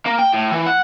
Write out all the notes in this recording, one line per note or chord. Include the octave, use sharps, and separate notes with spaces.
A#3
G5
A2
E3
F#5